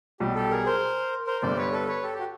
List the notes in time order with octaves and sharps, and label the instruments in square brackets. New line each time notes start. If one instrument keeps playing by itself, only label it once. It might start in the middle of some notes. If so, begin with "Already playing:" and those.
[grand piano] B1 B2 G3 [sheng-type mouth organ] G4
[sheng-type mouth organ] G4 A4
G#4 A#4
A#4 C5
A#4 C5
[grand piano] G1 G2 D3 [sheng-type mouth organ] C5 D5
[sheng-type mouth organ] B4 C#5
A4 B4
B4 C#5
G4 A4
G4
F#4